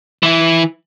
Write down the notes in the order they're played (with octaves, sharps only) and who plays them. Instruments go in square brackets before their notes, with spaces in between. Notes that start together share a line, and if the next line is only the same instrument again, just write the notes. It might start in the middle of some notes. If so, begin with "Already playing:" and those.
[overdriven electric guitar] E3 E4